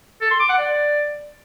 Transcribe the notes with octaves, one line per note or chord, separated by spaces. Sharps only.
A4
C6
D6
F#5
D5